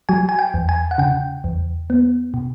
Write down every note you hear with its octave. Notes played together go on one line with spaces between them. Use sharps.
F#3 G#5
G#5
G5
E2
G#5
F#5
C#3 G5
E2
B3
B2